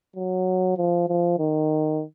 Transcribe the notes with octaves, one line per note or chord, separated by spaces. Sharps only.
F#3
F3
F3
D#3